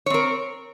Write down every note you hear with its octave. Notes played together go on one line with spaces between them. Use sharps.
C4 A#4 C#5